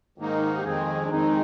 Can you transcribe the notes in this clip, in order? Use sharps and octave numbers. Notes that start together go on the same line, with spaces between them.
G#2 D#3 A#3 D#4 A#4
G4
F2 D#3 G#3 C4 G#4
D4
F2 D#3 G#3 C4 D#4